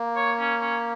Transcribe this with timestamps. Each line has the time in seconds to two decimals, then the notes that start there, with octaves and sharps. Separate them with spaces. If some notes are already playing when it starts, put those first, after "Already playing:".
Already playing: A#3
0.16 C#5
0.39 C#4
0.61 C#4